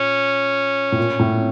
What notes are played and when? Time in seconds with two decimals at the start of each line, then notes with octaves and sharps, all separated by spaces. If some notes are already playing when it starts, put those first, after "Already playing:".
Already playing: A#2 C#4
0.92 A2
0.98 A#2
1.19 A2